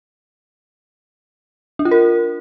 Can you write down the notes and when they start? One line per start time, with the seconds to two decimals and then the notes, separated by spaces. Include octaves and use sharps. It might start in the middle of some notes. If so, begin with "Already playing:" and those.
1.79 D4
1.85 F4
1.91 A#4